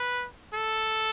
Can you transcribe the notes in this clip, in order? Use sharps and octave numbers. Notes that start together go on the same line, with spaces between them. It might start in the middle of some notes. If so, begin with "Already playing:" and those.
Already playing: B4
A4